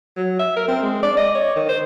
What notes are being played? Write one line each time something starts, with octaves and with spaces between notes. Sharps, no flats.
F#3
E5
A#4
C4
G#3
D5
D#5
C#5
D#3
C5